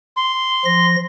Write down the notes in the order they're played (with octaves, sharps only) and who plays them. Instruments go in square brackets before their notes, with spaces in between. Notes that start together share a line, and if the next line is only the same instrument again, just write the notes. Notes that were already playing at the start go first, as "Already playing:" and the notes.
[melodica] C6
[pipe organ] F3 A#6